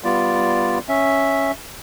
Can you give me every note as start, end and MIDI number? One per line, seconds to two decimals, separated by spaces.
0.04 0.78 55
0.04 0.78 59
0.04 0.78 65
0.04 0.78 74
0.89 1.51 61
0.89 1.51 76